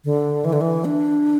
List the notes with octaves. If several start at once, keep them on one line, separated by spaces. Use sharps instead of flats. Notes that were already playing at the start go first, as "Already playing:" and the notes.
D3
E3
D3
E3
D4